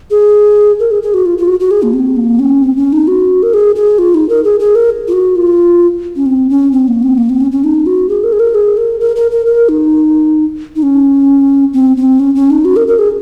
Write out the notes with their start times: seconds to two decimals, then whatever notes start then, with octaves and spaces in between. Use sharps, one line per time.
0.11 G#4
0.80 A#4
0.91 G#4
1.02 G#4
1.14 F#4
1.26 F4
1.38 F4
1.48 F#4
1.60 F#4
1.71 G#4
1.83 A#3
1.93 C4
2.17 A#3
2.39 C#4
2.63 C4
2.77 C#4
2.93 D#4
3.08 F#4
3.43 A#4
3.54 G#4
3.76 G#4
3.99 F4
4.15 D#4
4.29 A#4
4.44 G#4
4.60 G#4
4.75 A#4
5.08 F4
5.13 F#4
5.36 F4
6.16 C#4
6.26 C4
6.50 C#4
6.72 C4
6.88 A#3
7.03 C4
7.18 A#3
7.30 C4
7.41 C#4
7.52 C#4
7.64 D#4
7.86 F#4
8.09 G#4
8.24 A#4
8.33 G#4
8.40 A#4
8.55 G#4
8.77 A#4
9.00 A#4
9.16 A#4
9.31 A#4
9.46 A#4
9.69 D#4
10.76 D#4
10.83 C#4
11.73 C4
11.97 C4
12.20 C#4
12.35 C#4
12.50 D#4
12.65 F#4
12.76 A#4
12.88 A#4
12.99 G#4